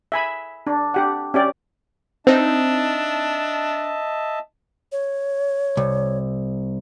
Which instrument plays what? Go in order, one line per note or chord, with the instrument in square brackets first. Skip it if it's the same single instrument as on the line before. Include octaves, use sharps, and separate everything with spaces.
[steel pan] E5 G#5 B5
D4
D4 G4 F#5
C#4 G4 D5
[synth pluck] C4 D#4 [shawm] D4 [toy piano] C5 [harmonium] D#5 E5 A5
[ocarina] C#5
[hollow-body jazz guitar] C2